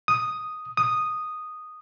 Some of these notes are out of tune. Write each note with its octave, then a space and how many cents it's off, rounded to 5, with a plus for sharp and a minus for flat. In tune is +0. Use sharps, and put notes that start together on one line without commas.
D#6 +0
D#6 -5